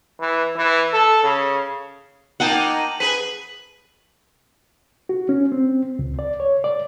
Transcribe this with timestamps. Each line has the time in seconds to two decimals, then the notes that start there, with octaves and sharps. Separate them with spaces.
0.20 E3
0.56 E3
0.93 A4
1.23 C#3
2.40 A#3 D#4 F#5 G5 A5 D#7 F#7
3.00 G#4 B4 B6 D#7 F#7
5.09 F#4
5.29 C#4
5.52 C4
5.99 C#2
6.19 D5
6.40 C#5
6.64 D5